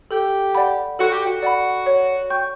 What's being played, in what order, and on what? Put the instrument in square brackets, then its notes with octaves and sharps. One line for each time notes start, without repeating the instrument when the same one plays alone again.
[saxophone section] G4 [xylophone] A4
[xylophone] D5 F#5 B5
[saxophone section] F#4 [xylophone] A4
[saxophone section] G4
F#4
[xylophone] D5 F#5 B5
C#5
G5 C#6 G6